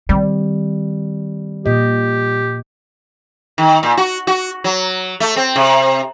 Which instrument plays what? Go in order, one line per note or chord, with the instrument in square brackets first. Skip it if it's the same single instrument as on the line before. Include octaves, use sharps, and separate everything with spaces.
[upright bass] D#3 C4 [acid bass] G3
[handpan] A#2 D#5 [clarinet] G4
[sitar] D#3
A#2
F#4
F#4
F#3
A3
C4
C3